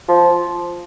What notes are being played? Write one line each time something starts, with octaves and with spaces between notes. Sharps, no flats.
F3